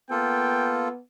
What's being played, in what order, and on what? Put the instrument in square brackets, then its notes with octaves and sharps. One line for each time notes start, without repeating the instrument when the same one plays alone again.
[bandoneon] A#3 F4 A4 [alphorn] B3 [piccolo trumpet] G5